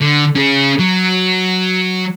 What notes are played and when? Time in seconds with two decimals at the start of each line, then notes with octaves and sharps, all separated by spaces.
0.01 D3
0.35 C#4 G#4
0.79 F#3